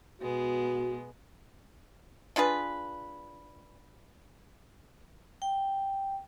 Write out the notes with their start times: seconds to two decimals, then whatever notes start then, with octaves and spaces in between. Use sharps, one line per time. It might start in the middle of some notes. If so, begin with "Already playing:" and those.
0.22 B2 G#3 B3 F#4
2.36 D4 F4 G#4 B4
5.42 G5